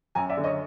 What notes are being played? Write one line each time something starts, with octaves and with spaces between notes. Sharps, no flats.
F#2 G#5 A#5
D5 E5
D3
C#5 D#5